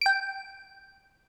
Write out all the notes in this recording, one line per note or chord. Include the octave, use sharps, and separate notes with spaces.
G5 D7